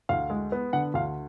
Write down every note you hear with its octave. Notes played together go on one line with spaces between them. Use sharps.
D2 F5
G#3
B3
D3 F#5
D2 F5